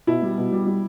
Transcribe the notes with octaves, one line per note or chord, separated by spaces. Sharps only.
B2 E4
G3
B2
G3
G3